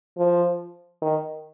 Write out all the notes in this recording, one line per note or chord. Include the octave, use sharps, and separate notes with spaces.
F3
D#3